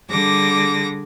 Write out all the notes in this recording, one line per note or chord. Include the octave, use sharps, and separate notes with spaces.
D3 G3 G#4 D6 A#6